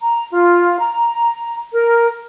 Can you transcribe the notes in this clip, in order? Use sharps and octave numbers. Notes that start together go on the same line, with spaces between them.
A#5
F4
A#5
A#4